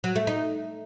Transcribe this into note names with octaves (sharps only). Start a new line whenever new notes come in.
F#3
A3
D#4